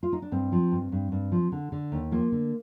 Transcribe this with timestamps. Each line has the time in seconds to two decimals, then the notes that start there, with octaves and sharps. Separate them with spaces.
0.03 F4
0.13 D#4
0.22 D4
0.32 G2 C4
0.52 F3
0.72 G2
0.92 G2
1.12 G2
1.32 F3
1.52 D3
1.72 D3
1.92 D#2
2.12 F3 A#3
2.32 D3